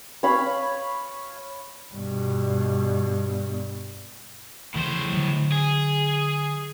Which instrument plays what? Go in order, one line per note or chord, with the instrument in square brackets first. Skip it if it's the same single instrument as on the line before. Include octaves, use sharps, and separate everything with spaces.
[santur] C#5 F5 B5
[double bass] G2 B2
[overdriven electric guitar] A2 C5 [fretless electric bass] C#3 E3 F3
[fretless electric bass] D3 F#3
[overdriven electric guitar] G#4